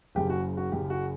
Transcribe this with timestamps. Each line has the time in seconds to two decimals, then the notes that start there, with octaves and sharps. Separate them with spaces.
0.15 F#1 F#2 C#3 G4
0.30 F#4
0.57 F#4
0.71 F#1 F#2 C#3 G4
0.90 F#4